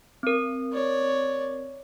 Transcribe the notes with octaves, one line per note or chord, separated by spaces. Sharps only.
C4 A#4
C#5 D5